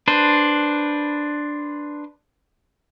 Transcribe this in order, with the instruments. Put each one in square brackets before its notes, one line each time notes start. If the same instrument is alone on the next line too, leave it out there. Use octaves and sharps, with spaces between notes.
[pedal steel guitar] D4 B4 C5